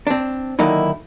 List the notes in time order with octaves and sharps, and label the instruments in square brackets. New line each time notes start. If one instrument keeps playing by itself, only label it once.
[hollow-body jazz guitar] C4 D4
D3 D#3 F#3 A#3 D#4 E4